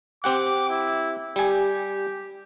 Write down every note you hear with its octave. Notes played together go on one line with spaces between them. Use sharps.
C4 G4 F#5 D6
E4
G3 G4 G#5